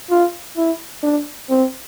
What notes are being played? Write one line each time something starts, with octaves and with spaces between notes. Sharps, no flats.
F4
E4
D4
C4